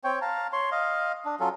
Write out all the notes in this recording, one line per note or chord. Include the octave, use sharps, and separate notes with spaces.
C4 C#5 G5
F5 A5 A#5
C#5 C6
D#5 F5
D4
F#3 C#4 F4 A4